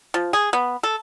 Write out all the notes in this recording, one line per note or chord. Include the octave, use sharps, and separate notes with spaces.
F3
G#4
B3
A4